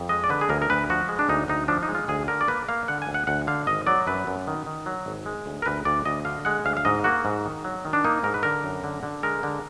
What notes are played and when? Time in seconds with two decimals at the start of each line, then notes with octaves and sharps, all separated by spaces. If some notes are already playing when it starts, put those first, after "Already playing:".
Already playing: F2
0.09 G#3 D#5
0.24 D5
0.29 D3 B4
0.41 G#4
0.49 D2 A#4
0.62 A#4
0.70 D2 B4
0.90 F3 F#4
1.09 G#3
1.19 D4
1.29 D2 D#4
1.48 D2 D#4
1.68 F3 D4
1.83 D#4
1.88 G#3
1.95 F4
2.08 D2 G#4
2.28 D3 A#4
2.41 D5
2.48 A#3 B4
2.68 A#3 F5
2.88 D3 F#5
3.02 G#5
3.07 D2
3.14 F#5
3.27 D2 F#5
3.47 D3 F5
3.67 G#1 D#5
3.87 F#3 D5
4.07 F#2 B4
4.27 F#2
4.47 D#3
4.66 D#3
4.86 F#3
5.06 G#1
5.26 G#3
5.46 D2
5.62 A#4
5.66 D2 B4
5.85 D2 D5
6.05 D2 D#5
6.25 D3 F5
6.45 G#3 F#5
6.65 D2 F5
6.77 F5
6.85 G#2 D#5
7.04 A#3 F#4
7.25 G#2
7.45 D#3
7.64 F#3
7.85 D#3
7.93 D4
8.04 A#3 D#4
8.23 G#2 A#4
8.34 B4
8.43 D3 A#4
8.64 F#2
8.84 D3
9.03 D3
9.23 G#3 A#4
9.43 D3